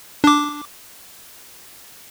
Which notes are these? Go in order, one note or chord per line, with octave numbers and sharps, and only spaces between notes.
D4 D6